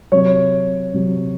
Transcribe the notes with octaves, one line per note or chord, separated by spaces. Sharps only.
C3 F#3 C#5
C3 F#3